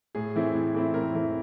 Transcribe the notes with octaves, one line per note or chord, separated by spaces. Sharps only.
A2 G#4
E3 A3 C4 E4
A2
E3 A3 C4 E4
A2 A#4
E3 A3 C4 E4